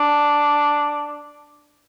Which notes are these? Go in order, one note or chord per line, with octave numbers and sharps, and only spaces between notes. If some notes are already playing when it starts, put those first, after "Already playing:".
Already playing: D4